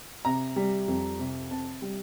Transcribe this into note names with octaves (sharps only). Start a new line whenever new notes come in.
C3 A#5
G3
F2
C3
C3 A5
G3